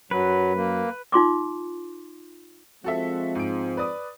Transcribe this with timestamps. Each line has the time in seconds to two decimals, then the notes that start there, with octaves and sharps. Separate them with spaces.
0.11 F#2 F#3 B4
0.57 A#3
1.12 D#4 F4 C6 D6
2.84 F3 G#3 C4 F#4 A4 E5
3.35 G#2 D7
3.77 B4 D5 D#6